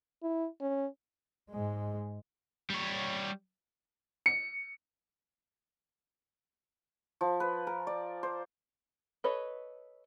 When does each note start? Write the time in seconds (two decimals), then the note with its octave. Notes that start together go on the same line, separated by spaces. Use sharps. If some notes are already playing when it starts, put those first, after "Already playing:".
0.23 E4
0.61 C#4
1.50 G#2 G#3
2.70 G3 C#5
4.26 C#7
7.21 F3
7.40 B4
7.67 A#4
7.87 D5
8.23 C5
9.24 A4 B4 C#5 D#5